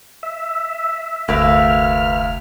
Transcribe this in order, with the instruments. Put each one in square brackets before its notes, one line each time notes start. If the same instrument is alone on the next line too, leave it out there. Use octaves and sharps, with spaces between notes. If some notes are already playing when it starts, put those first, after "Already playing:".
[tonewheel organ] E5
[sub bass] F1 [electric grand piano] D2 [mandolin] A#3 B4 E5 [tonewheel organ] F6